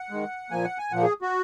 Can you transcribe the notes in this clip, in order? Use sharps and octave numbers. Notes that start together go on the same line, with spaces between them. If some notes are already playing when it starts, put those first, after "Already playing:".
Already playing: F#5
D#3 G#3
A#2 F3 A#3 G#5
F#5
G#5
A#2 F3 A#3 F#5
G#4
F#4